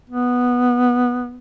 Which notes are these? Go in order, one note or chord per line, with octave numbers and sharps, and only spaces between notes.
B3